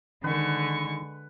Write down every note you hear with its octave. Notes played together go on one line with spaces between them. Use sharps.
D3 D#3 G#3 B4 C#6